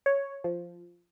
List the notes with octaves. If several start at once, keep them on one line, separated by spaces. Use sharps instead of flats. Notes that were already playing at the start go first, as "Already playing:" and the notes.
C#5
F3